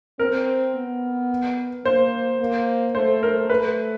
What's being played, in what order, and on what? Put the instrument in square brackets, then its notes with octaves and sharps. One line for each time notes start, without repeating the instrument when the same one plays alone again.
[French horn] C4 [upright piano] A#4
[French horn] B3
[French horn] A#3 [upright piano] C5
[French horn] A#3
[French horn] A3 [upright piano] C5
[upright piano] A#4
[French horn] A3 [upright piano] B4